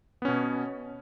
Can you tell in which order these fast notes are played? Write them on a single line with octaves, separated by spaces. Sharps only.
B3 C#4 B2